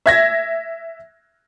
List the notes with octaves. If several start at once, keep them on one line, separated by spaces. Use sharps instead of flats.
E5 G#6 A#6